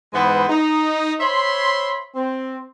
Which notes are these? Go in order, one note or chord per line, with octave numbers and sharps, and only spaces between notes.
G#2 E3 G#3 B3 B4 C5
D#4
C5 C#5 E5 B5 C6
C4